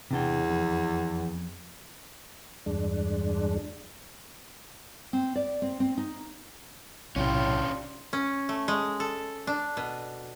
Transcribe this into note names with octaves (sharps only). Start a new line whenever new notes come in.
E2 C3 D4 G5
F2
E2 G2 G#3 D4
C4
D5
C4
C4
D#4
B1 A2 C3 C#4 D4 F4 G4
C#4
A3
G#3
A4
D4
B2